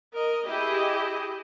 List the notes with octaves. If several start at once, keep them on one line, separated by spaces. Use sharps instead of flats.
A#4 D#5
E4 G4 G#4 D#5